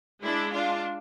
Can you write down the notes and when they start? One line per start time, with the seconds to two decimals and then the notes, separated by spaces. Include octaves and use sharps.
0.23 G#3 D4 E4
0.52 D4 F4